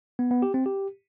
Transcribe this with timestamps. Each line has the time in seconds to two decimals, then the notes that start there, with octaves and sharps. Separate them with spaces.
0.19 B3
0.31 B3
0.42 G4
0.54 C4
0.66 G4